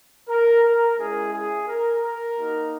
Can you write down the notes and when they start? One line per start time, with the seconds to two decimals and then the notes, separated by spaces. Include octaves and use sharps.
0.29 A#4
0.63 A#4
0.98 G#3 C#4 E4 G#4
1.33 G#4
1.67 A#4
2.02 A#4
2.37 A#3 D#4 F#4